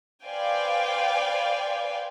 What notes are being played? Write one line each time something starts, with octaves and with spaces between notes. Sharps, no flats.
B4 C5 D5 F5 G5 G#5